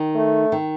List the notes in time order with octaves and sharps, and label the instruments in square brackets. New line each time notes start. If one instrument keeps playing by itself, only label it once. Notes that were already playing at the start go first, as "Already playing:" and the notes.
Already playing: [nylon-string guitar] D#3
[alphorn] A3
[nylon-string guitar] D#3